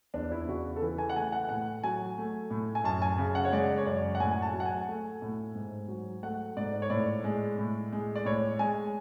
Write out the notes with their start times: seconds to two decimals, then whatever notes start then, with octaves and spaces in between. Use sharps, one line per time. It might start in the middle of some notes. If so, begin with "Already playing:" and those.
0.14 E2 D4
0.32 E4
0.47 C#3 F#4
0.76 A4
0.81 E3 B4
0.98 G#5
1.09 F#5
1.16 A3 G#5
1.32 F#5
1.49 A2 F#5
1.84 F#3 G#5
2.18 A3
2.50 A2
2.75 G#5
2.84 F#2 A5
3.02 G#5
3.18 C#3
3.35 F#5
3.45 C#5
3.52 G#3 D5
3.78 C#5
3.86 F#2 D5
4.15 F#5
4.20 A2 G#5
4.31 G#5
4.42 A5
4.54 F#3
4.60 F#5
4.66 G#5
4.88 A3
5.22 A2
5.55 G#2
5.88 F#3
6.23 A3 F#5
6.57 G#2 D5
6.82 C#5
6.90 A2 D5
7.24 G#3
7.58 A2
7.93 G#3
8.16 D5
8.25 A2 C#5
8.59 G#3 G#5